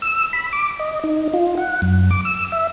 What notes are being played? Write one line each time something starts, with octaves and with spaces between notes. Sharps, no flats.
E6
B5
D6
D#5
D#4
F4
F#5
F#2
D6
E6
E5